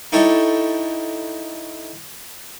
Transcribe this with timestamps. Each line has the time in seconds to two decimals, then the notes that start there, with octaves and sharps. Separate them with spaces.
0.12 D#4 E4 G4 A4 C#5